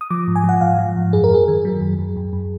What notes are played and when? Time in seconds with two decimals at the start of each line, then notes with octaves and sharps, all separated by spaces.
0.01 D#6
0.11 F3 D6
0.27 G#2
0.36 G#5
0.44 F3 F#5
0.61 G#2 F5
0.79 F3
0.96 G#2
1.13 F#2 G#4
1.24 A#4
1.31 F#2 G#4
1.48 D#3
1.65 F#3
1.81 F#2
1.99 F#2
2.17 F#2
2.33 F#2